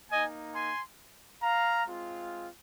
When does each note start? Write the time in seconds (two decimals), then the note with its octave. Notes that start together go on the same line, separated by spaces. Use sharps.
0.11 A#3 D#4 D#5 G#5
0.54 G#5 C6
1.43 F5 A#5
1.87 G#3 C4 F4